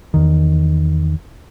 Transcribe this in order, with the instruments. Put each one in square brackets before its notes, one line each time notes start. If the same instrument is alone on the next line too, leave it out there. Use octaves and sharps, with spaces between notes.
[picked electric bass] E2 D#3